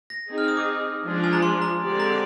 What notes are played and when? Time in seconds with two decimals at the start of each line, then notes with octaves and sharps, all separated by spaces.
0.10 A#6
0.29 C4 D#4 G#4
0.38 F6
0.48 D#6
0.57 D6
1.05 F3 G#3 D4 F4 G#4
1.24 G#5
1.33 A#5
1.42 C6
1.62 A#5
1.81 D3 G#3 C4 G4 D5
2.00 A#5